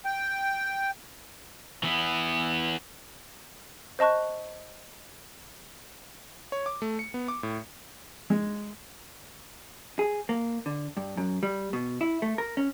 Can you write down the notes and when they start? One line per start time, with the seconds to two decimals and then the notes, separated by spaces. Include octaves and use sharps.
0.05 G5
1.83 E3 B3
3.99 C5 D#5 A5 C#6 F#6
6.52 C#5
6.66 D6
6.82 A3
6.99 C#7
7.14 B3
7.28 D6
7.43 A2
8.30 G#3
9.99 G#4
10.29 A#3
10.66 D3
10.97 G2
11.17 F#2
11.43 G3
11.73 B2
12.01 E4
12.22 A3
12.38 A#4
12.57 C#4